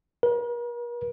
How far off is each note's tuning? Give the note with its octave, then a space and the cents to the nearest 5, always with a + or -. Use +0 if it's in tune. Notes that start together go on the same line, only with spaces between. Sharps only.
A#4 +45